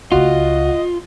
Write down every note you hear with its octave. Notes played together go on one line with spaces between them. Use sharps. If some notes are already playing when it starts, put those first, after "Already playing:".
C#2 A3 F4 F#4 D#5